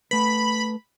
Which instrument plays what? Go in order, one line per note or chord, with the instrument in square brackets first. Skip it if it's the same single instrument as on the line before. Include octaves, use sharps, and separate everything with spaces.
[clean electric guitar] A3 B4 [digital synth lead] B5